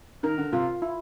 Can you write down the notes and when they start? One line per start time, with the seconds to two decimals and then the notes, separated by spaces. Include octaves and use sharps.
0.23 D#3 A#4
0.38 D3
0.53 C3 F4
0.82 E4